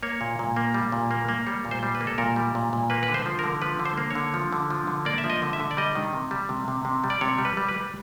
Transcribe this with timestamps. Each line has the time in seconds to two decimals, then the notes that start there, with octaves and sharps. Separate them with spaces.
0.03 A#3 C#5
0.21 A#2
0.39 A#2
0.56 A#3
0.74 G3
0.92 A#2
1.11 A#3
1.28 A#3
1.46 G3 C#5
1.65 A#2
1.71 C5
1.83 G3
1.95 B4
2.01 A#3
2.07 A4
2.18 A#2 A#4
2.36 G3
2.55 A#2
2.73 A#2
2.90 A#3 B4
3.03 B4
3.08 D3
3.14 C5
3.26 F3
3.39 A#4
3.44 D3
3.62 F3 B4
3.80 D3
3.85 C5
3.97 A#3
4.10 D3 C#5
4.34 F3
4.53 D3
4.70 F3
4.87 D3
5.05 A#3 D5
5.18 E5
5.24 F3
5.30 D#5
5.42 D3
5.53 E5
5.60 D3
5.71 D5
5.77 G3 D#5
5.95 D#3
6.13 C3
6.31 G3
6.49 C3
6.68 C3
6.85 C3
7.04 G3
7.10 D5
7.21 C3 C#5
7.39 G3
7.45 B4
7.57 G3
7.68 B4
7.74 G3